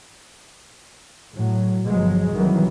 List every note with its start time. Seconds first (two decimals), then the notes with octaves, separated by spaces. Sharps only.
1.34 A2 F#3
1.86 G1 B2 F3 F#3 G#3
2.33 C2 D#3 E3 F#3